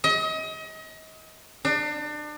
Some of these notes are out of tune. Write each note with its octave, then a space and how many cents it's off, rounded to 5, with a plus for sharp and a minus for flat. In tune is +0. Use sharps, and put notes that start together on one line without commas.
D#5 +35
D4 +35